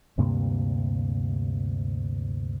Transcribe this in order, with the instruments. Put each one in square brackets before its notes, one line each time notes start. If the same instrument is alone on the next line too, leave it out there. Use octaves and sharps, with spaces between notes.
[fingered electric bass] D2 G2 C3 A#3